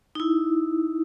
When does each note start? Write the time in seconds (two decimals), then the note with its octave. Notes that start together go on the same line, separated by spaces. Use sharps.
0.15 D#4 E4